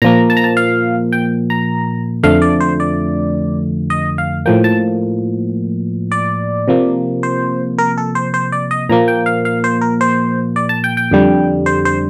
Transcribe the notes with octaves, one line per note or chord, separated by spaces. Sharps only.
A#2 F3 A#3 A#5
A5
A#5
A5
F5
G5
A#5
F2 D3 F3 A3 F5
D5
C5
D5
D#5
F5
A2 F3 A#3 G5
A5
D5
C3 F3 A#3
C5
A#4
A4
C5
C5
D5
D#5
A#2 F3 A#3 A#5
G5
F5
F5
C5
A#4
C5
D5
A5
G5
G5
F2 D3 G3
C5
C5